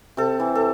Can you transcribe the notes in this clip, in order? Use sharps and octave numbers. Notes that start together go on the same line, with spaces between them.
C3 A4
E3
A4